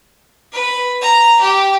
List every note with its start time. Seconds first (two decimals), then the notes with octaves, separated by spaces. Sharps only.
0.52 B4
1.01 A#5
1.40 G4